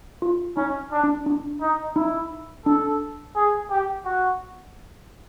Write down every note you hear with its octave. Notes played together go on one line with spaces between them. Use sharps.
F4
C#4 D#4
D4
D4
D4
D#4
D#4 E4
D4 A4
G#4
G4
F#4